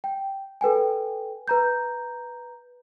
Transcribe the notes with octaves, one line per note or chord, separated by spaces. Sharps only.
G5
A4 B4 G5 G#5
B4 A#5 G6